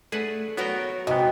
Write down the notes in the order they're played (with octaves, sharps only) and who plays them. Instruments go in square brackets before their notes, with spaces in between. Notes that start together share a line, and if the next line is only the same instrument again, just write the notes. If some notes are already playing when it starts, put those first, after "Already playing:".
[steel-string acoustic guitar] A3 D4 [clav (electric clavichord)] G#4 B4 F#5
[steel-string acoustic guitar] F#3 F#4 C#5 [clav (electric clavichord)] B3 A#4 G5
[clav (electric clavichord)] G#2 B3 [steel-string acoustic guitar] C3 [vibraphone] F#4 G5 [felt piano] D#5